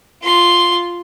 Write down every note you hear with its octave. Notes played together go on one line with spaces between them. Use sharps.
F4 C6